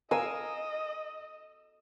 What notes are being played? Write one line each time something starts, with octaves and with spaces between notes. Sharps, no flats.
A#4 D#5 F5 G#5 E6